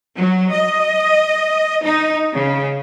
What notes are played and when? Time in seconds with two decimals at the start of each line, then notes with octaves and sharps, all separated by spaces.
0.17 F#3
0.52 D#5
1.82 D#4
2.34 C#3